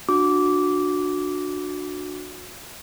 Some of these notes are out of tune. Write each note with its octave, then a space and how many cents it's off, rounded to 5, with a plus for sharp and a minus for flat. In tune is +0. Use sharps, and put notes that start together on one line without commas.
D4 +15 F#4 -20 D6 -15